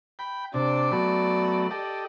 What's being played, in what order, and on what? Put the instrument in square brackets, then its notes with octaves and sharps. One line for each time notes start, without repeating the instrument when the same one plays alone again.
[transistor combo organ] G5 B5
[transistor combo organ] C3 D4 [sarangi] D5
[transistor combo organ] F#3 A3 B3
G4 A4 D#5